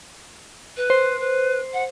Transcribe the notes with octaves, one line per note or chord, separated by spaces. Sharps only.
B4
C5
B4
F#5